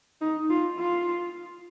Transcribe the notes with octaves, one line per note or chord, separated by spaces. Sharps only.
D#4
F4
F4